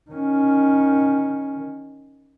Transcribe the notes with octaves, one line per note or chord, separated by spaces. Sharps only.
D#3 C#4